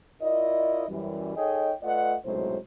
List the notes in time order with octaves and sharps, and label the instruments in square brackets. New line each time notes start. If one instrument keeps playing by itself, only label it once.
[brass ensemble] E4 F4 A#4 D5 D#5
F#2 E3 G3
D#4 G#4 A4 C#5 D#5 G5
A3 F4 B4 D5 D#5 F#5
B1 A2 C3 F#3 G#3 C5